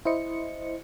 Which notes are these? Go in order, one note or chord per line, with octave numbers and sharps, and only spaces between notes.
E4 C5 D#5 C#7